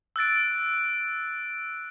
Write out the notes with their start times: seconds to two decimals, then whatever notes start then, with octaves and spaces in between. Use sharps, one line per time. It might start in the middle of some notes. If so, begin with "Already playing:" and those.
0.16 E6 F#6 A6 D7